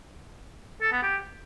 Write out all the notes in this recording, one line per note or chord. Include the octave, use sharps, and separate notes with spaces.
A4
B3
G4